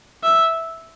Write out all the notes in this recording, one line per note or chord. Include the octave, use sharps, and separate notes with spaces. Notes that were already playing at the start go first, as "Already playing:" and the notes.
E5